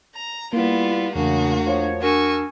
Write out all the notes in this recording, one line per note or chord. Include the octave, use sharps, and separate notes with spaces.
A#5
G3 A#3 B3 E4 F4
E2 C#3 A3 A#3 D4 F#4
F3 C#5
D4 F#4 A#4 G#5 C#6 E6